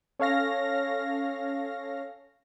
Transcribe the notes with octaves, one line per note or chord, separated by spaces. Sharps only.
C#4 A4 C#5 F5 F6 A#6